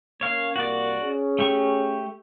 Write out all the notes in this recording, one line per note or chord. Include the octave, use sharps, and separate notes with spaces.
A#3 C#4 C#5 F5
C2 A#3 F#4 D5
C#4 G#4
A3 G4 C#6